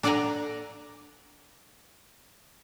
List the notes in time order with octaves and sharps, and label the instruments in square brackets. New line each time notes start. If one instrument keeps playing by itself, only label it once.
[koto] D4 A4 D5 F#5 G#5 A#5